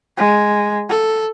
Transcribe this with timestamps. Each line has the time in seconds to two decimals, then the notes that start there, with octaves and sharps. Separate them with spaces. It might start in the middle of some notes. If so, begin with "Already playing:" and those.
0.18 G#3
0.89 A4